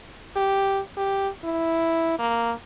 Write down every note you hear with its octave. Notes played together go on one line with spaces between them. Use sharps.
G4
G4
E4
A#3